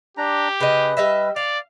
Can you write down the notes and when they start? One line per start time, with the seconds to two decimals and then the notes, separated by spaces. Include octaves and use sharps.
0.17 D4 G4 A#5
0.60 C#3 B4 D#5
0.97 G3 D#5 E5
1.36 D5 F5